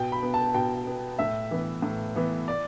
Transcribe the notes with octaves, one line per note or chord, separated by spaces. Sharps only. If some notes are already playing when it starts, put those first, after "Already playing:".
Already playing: B2 G5
B5
B3
A5
B2 G5
B3
A2 E5
E3 B3
A2
E3 B3
D5